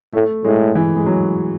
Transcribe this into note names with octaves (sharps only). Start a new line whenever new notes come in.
A2 A3
A2 G#3
E3
G#3
F#3